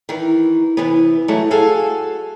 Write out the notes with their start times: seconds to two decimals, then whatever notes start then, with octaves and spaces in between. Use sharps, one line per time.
0.09 D#3 E3
0.77 C3 E3 B3
1.28 E3 F#3 G#3 A3
1.51 F#4 G#4 A4 F5 G#5